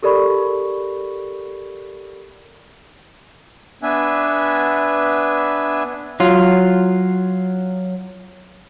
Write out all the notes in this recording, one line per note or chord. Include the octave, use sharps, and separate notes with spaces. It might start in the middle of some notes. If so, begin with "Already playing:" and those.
G4 A4 A#4 D5 B5 C#6
B3 D4 B4 E5 G#5
F#3 F4